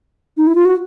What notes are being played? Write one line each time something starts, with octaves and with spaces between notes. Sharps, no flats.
D#4
E4
F4
F#4